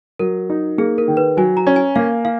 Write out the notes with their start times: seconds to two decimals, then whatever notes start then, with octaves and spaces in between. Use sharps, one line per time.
0.19 F#3 A#4
0.50 D#4
0.78 A#3 G#4
0.98 A#4
1.08 D#3
1.17 B4
1.37 F#3 G#5
1.57 A#5
1.67 C#4
1.76 G#5
1.96 A#3 F5
2.25 F5